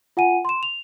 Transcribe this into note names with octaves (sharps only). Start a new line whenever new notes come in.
F4 F#5 G#5 D#7
C6 E7
F7